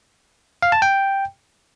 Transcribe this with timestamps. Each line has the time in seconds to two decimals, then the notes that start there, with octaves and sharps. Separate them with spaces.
0.62 F5
0.72 A5
0.82 G5